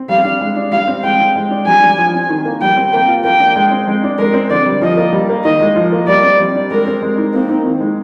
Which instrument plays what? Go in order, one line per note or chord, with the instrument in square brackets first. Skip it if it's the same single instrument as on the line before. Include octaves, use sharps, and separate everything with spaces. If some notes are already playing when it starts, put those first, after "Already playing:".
Already playing: [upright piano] C4
[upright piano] G3 [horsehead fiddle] F5
[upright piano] D4
G#3
D4
[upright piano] G3 [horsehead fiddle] F5
[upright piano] C4
[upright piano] G#3 [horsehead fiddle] G5
[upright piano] C4
G#3
D4
[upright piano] G3 [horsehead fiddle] G#5
[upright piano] D4
F3
C4
D#3
A#3
[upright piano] G3 [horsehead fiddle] G5
[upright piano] C4
[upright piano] A#3 [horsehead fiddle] G5
[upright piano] F4
[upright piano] A#3 [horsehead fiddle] G5
[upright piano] D4
G#3
C4
G#3
D4
[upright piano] G#3 [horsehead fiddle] A#4
[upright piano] C4
[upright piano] D3 [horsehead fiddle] D5
[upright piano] G3
[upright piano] F3 [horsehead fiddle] D#5
[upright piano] A#3
G3
A#3
[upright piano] D#3 [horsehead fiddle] D#5
[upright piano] G#3
F3
A#3
[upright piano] G3 [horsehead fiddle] D5
[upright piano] C4
G3
D4
[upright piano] G#3 [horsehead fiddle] A#4
[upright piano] C4
G#3
D#4
[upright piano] A#3 [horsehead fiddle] C4
[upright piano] D#4
D#3
G#3